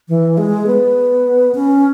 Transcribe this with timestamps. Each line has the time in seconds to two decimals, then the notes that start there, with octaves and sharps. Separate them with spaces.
0.09 E3
0.38 G#3
0.67 B3
1.55 C#4